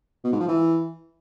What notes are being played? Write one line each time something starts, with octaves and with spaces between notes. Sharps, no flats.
B2
G#2
F3
E3